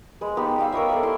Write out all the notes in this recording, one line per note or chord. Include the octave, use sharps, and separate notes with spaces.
G#3 B4
B3 D#4 G4
G3 F5 E6
A#4 C#5 D#5 E5
A4 D5
E4 C6